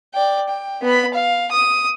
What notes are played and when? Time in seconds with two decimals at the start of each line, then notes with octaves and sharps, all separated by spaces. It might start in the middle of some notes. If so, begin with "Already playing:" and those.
0.14 D5 G5
0.49 G5
0.82 B3 B5
1.14 F5
1.52 D#6